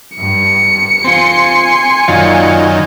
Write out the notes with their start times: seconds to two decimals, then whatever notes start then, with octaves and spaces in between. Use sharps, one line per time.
0.18 G2 C#7
1.04 C4 F4 G#5 C6
2.08 F#2 D#3 F4 D5 F5